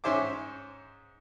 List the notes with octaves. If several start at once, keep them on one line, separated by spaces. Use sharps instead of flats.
G#2 C#4 C5 E5 D6